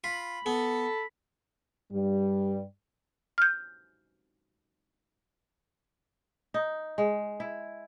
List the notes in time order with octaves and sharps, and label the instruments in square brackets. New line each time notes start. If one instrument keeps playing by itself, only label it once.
[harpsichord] F4 [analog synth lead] B5
[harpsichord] B3 [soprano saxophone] A4
[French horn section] G2 G3
[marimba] F6 G6
[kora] D#4
G#3
E4